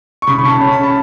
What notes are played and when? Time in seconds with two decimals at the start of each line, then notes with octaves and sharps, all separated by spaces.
0.22 C#6
0.27 C#3 B5
0.39 C#6
0.44 C#3 A5
0.50 B5
0.61 C#4 C#6
0.73 B5
0.83 A5